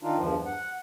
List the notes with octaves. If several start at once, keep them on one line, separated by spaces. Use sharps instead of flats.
D#3 D4 D#4 F4
E2 G2 F3
F#5